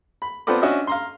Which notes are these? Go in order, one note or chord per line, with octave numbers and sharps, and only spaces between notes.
B5
B3 C4 F4 A4 B4 D5
C#4 D4 F#4 D#5 E5
F5 A#5 C6